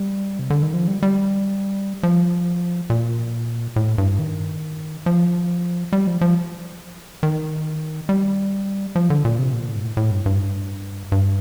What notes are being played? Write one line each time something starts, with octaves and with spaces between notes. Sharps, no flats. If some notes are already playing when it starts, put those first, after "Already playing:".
Already playing: G3
C3
D3
D#3
F3
G3
G3
F3
A#2
A2
G2
D#3
F3
G3
F3
F3
D#3
G3
F3
D3
A#2
C3
A#2
A2
G2
A2
A2
G2
G2
G2